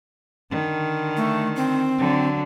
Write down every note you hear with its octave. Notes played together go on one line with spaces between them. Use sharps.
D3 D#3
A3
C4
D3 F#3